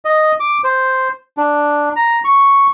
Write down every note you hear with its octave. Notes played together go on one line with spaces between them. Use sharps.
D#5
D6
C5
D4
A#5
C#6